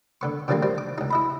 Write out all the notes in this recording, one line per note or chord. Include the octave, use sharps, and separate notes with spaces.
D3 B3 C#6
D3 D#3 F3 G3 A#3 C4
G3 C4
D6
C#2 D#4
E4 D#5 B5